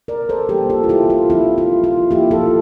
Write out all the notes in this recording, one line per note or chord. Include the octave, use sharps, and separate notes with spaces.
A#4 D5
A4 C5
E3 G3 A#3 D4 G4 A#4
F4 A4
F4
E4 G4
F4
F3 C4 E4
F4
F4
F3 A#3 E4 G4
F4 A4